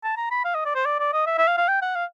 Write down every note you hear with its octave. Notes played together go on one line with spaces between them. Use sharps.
A5
A#5
B5
F5
D#5
D5
C5
D5
D5
D#5
E5
E5
F5
F5
G5
F#5
F5